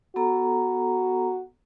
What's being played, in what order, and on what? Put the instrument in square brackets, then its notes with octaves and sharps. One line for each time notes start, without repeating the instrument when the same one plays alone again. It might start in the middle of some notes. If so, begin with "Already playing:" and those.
[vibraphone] B3 A4 A#5 [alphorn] F#4